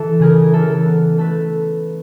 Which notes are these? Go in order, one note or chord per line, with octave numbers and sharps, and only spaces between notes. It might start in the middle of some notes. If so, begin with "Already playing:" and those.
Already playing: E3 A4
C#3 G#4 A#4
E3 A4
A#4
A4
B3
A3 A4 B4